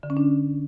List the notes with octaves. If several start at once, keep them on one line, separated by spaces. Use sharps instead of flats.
D3
C#4
D4